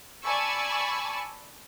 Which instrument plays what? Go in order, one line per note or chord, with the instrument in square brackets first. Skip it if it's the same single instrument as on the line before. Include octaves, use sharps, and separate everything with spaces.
[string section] D5 G#5 A5 B5 C#6 E6